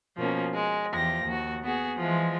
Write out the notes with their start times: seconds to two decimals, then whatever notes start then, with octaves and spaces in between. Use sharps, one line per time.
0.17 B2 F3 A#3 C#4
0.53 G#3
0.93 E2 F3 G4 A#6
1.25 D#2 F#4
1.63 B3 F#4 G#4
1.98 E3 F3 G#3